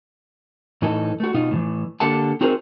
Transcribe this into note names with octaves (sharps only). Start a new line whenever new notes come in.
A2 E3 D#4 A4
A3 F#4
B2 D#4 F4
A2 C#3 E3
D3 A#3 G4 A4 F#5 A5
C4 D#4 F#4 G#4 A#4 C5